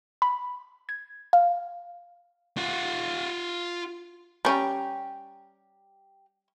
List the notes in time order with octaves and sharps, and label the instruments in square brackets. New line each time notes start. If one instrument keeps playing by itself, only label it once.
[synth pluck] B5
G#6
F5
[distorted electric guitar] F4 F#5
[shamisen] G3 C#4 [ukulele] G4 G5 A#5